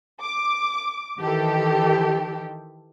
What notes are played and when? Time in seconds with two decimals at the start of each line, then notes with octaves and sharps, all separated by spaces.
0.21 D6
1.18 D#3 E3 G4 A4